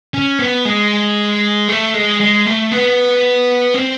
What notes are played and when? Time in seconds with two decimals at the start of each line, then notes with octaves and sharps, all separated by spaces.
0.14 C#4
0.39 B3
0.65 G#3
1.68 A3
1.94 G#3
2.20 G#3
2.46 A3
2.71 B3
3.74 C4